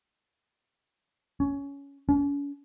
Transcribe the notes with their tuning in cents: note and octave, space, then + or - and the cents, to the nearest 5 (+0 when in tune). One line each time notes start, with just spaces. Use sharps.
C#4 +15
C#4 +40